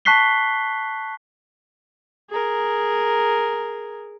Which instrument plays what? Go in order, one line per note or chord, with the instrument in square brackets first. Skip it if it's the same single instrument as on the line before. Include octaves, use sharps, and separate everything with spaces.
[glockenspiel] A5 C#6 F#6 B6 C7 G7
[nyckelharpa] G#4 A#4